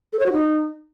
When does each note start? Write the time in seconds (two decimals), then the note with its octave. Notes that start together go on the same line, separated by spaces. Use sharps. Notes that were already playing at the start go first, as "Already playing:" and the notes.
0.13 A4
0.19 C#5
0.26 F#4
0.32 D#4